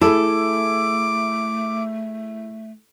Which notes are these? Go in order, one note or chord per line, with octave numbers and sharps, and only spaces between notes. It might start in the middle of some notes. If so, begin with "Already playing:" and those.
A3 E4 G#4 A4 D6